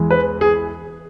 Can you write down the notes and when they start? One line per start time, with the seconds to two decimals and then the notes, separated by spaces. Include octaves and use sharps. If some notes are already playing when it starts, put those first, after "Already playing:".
Already playing: E2 E3 G#3
0.11 B4
0.41 G#4